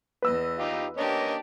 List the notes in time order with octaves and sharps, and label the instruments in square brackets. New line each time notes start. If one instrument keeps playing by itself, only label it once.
[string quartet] E2 D#5 [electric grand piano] B4 E6
[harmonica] D#4 F4 G4
[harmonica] A#3 C#4 D#5 [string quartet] D4 G4